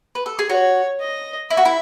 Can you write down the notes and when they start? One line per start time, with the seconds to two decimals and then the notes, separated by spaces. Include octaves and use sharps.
0.15 B4
0.26 A4
0.39 G#4
0.50 F#4 C#5
1.01 D#5
1.51 E4 E5
1.57 F#4
1.65 E4